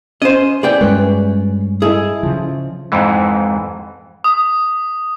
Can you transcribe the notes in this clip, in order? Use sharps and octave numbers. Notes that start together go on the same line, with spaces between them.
C#4 C5 D#5
B3 E4 G#4 B4 D5 G5
G2 G#3 C#4 F#4 B4 C#5
E4 G#4 A4 D#5
C#3 F3
F2 G#2 E3
D#6